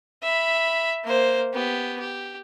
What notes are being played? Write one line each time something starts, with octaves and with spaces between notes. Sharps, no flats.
E5 B5
A#3 C5
B3 G4
G4